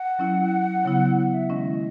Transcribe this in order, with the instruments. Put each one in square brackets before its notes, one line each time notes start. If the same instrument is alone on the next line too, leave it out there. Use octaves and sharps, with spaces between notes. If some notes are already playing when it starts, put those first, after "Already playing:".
Already playing: [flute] F#5
[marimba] F#3 C#4 E4
C#3 F#3 B3 E4
[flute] F#5
E5
[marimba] D#3 G#3 C#4 E4 [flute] D#5